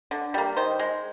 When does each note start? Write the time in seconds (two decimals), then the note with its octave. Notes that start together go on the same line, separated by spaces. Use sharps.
0.11 D3
0.34 G3 A#3
0.57 D#3 C5
0.79 G#3